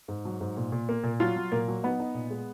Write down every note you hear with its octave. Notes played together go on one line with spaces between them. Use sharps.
G#2
F#3
G#2
A#2
A#2
A#3
A#2
F#3 F4
F#3
A#2 A#3
F#3
B3 D#4
D#4
A#2
G#3